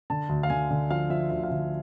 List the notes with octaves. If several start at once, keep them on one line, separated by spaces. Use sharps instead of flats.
D3 A5
D2
F5
D3 G#5
D3
F3 F5
F3 E5
D2 E5
F5
D3 E5